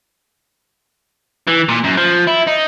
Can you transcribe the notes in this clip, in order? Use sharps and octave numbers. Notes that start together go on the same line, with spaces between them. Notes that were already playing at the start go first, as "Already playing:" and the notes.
E3
A#2
F#2
F3
E4
D#4